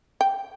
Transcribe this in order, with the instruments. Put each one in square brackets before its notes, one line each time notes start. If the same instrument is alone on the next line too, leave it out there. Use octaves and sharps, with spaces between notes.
[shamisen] G5